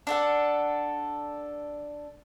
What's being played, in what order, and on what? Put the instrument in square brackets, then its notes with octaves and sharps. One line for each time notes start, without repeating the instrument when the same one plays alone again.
[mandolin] D4 A4 F#5